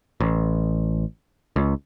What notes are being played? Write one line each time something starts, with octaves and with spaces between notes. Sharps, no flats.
A1
C#2